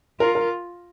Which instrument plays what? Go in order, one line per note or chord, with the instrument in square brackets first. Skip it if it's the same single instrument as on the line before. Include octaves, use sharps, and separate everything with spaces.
[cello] F4 [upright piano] A#4
[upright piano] A#4